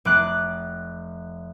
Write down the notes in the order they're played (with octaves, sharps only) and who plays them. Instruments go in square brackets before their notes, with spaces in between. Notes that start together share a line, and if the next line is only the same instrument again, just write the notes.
[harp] F1 D6 F#6